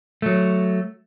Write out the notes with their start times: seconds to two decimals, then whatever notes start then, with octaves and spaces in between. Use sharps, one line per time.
0.22 F#3 A3